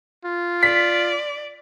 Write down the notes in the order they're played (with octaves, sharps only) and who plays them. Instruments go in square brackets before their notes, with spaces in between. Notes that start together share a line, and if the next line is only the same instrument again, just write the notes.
[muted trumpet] F4
[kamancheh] D5 [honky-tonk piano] B6